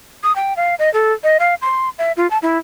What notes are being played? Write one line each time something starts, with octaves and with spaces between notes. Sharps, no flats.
D#6
G5
F5
D#5
A4
D#5
F5
C6
E5
F4
A5
E4